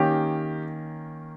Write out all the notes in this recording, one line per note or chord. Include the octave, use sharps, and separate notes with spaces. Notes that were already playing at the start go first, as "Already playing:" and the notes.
Already playing: D#3 A#3 C#4 G4